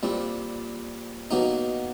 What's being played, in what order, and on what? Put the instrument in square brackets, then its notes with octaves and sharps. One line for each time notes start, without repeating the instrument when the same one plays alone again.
[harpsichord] A#2 G3 C4
B2 F#3 A#3 D#4